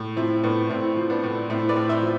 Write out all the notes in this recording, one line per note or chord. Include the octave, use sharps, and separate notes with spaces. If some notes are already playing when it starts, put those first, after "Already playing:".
Already playing: A2
F3 C4 E4
A2 B3 D4
A2 C4 E4
F3
B3 D4
A2
A2 C4 E4
B4 D5
A2
C5 E5
F3